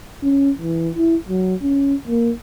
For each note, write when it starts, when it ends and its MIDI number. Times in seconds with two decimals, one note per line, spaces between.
0.23 0.50 61
0.58 0.90 52
0.96 1.16 64
1.29 1.55 54
1.62 1.95 61
2.08 2.32 58